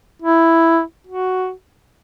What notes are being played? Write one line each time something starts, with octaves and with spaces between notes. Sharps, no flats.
E4
F#4